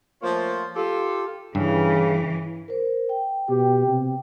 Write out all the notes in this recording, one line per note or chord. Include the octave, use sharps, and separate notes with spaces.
F3 A3 A#3 F4 C5 C#5
F4 G4 A4
G2 C#3 E3
A#4 C5
G5
B2 G4
C3